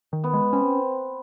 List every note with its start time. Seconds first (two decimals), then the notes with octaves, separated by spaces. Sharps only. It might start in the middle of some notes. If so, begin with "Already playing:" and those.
0.13 D#3
0.24 B3
0.33 G#3
0.53 C4 C#4